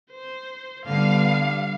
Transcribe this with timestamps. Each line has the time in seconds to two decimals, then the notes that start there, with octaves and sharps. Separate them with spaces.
0.11 C5
0.86 D3 G3 B3 F5